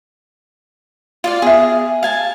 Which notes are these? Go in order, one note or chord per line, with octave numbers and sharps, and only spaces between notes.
F4 D5 F5
B3 G#4 E5
F5 G#5 A5